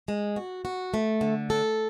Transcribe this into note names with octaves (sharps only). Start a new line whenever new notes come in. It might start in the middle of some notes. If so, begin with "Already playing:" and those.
G#3
F#4
F#4
A3
D3
A4